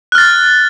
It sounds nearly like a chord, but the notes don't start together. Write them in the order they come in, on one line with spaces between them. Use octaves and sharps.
F#6 F6 A6